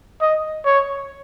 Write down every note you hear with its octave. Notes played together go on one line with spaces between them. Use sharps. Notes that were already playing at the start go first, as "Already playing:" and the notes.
D#5
C#5